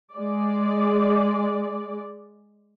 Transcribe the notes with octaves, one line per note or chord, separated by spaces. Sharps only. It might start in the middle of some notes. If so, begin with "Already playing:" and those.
G#3 D5